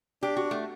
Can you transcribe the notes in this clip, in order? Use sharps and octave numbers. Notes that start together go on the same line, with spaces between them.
D4 G4
F#4
A3